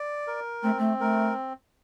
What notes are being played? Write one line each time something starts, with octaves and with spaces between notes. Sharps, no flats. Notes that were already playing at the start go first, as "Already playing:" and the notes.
Already playing: D5
A#4
A3 C4
A3
A3 A#4